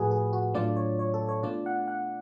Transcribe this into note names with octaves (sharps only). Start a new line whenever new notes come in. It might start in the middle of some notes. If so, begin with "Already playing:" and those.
Already playing: A2 F3 A3 F#4 G#4 B4
G#4
F#4
A2 F#3 A3 D4 F4 D5
C#5
C#5
A4
C#5
B2 A3 D4 F4 D5
F#5
F#5